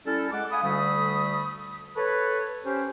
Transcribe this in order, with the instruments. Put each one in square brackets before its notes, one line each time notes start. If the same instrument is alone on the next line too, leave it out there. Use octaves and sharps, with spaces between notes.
[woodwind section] G3 C#4 E4 G4 A4
G#3 F#5 D6
F5 F#5 G#5 B5 D#6
D2 D3 G3 A3 B5 D#6
A4 B4 C#5
C#4 G4 C5